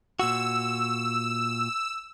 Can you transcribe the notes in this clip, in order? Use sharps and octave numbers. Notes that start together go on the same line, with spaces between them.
A#2 F#4 E6